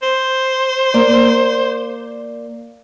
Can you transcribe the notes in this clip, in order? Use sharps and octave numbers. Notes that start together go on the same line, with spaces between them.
C5
A#3 D5